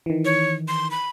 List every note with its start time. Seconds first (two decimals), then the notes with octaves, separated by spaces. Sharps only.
0.06 D#3 E3
0.25 C#5
0.68 C6
0.91 B5